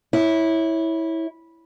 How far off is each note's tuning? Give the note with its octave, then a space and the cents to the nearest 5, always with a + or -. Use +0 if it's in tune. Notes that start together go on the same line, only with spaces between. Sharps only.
E4 -15 C#5 +0